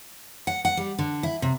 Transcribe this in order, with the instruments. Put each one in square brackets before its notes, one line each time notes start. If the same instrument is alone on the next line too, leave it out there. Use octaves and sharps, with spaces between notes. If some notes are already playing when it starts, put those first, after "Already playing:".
[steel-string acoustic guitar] F#5
F#5
G3
D3
E4
C3